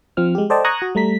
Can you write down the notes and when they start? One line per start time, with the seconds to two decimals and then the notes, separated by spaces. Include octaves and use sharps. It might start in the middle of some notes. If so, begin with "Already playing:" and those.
0.17 F3 C4 F6
0.35 G#3 G4
0.50 A4 C5 D5 D#5 G5 A5
0.65 A#5 C#6 D#6 F#6 G#6 A#6
0.82 F#4
0.95 G3 A3 A#5 B6